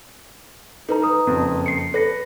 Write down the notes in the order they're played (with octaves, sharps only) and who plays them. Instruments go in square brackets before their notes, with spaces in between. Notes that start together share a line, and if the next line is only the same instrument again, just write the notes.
[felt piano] D#4 [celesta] A4 B4 A#5
[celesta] B4 A#5 D#6
[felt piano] F#1 F2
[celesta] C7 C#7
[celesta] A4 A#6 C#7 [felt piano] B4